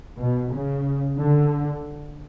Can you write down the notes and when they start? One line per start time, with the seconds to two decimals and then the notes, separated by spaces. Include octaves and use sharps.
0.18 B2
0.52 C#3
1.19 D3